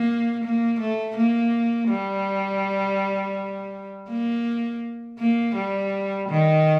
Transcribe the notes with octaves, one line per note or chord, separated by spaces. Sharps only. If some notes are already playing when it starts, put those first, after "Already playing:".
Already playing: A#3
A#3
A3
A#3
G3
A#3
A#3
G3
D#3